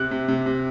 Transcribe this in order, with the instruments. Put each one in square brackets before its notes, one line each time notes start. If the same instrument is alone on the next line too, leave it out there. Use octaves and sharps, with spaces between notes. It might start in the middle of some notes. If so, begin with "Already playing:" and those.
Already playing: [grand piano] C3 F#6
C3
C3
C3